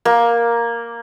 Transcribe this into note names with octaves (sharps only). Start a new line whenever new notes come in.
A#3